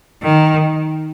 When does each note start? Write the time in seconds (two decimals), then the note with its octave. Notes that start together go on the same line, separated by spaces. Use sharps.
0.23 D#3